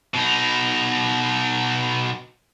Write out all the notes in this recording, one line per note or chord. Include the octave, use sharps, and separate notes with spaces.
B2 D#4